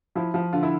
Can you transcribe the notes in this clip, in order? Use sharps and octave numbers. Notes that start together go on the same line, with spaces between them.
F3 E4
F3
D3 F4
E4